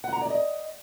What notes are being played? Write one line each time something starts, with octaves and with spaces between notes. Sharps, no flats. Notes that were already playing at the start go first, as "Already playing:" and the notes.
F#5
A#5
D5
D#5